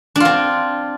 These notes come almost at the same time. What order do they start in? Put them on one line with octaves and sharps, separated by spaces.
D4 F4 C4